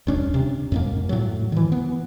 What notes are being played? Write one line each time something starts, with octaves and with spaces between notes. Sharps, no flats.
D#1 C#4 D4
C3
F2 G#2 A#3
A2 F#3
D#3 E3
B3